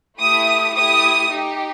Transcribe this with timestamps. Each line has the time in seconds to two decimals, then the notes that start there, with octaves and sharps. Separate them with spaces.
0.20 A3 E4 G4 D#6
0.75 A3 E4 G4 D#6
1.30 D#4 G4